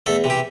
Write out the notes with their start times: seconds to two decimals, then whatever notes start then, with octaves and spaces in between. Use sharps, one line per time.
0.06 E2 A3 A4
0.24 C3 E3
0.30 G4